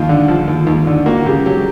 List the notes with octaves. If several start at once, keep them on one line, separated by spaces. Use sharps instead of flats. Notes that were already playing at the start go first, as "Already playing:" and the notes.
Already playing: D#2 F3 F4
D3
F3
D#2
D#2
D3
A#3 F#4
C#3 G4
F#3 G4